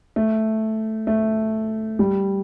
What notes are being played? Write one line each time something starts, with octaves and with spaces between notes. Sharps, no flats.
A3
A3
G3